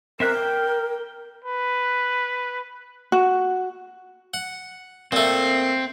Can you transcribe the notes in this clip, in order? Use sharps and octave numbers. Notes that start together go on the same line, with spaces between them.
C4 A#4 E5 F#6
G5
B4
F#4
F#5
A#2 A3 C4